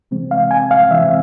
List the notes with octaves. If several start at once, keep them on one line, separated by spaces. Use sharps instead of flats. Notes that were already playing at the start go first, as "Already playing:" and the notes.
C3 E3 G#3 C4
F5
G#5
F5
C3 E3 G#3 C4 E5